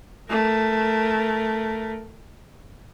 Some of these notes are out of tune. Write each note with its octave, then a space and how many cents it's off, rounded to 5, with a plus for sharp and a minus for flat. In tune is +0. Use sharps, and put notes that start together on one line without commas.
A3 +0 A#4 +0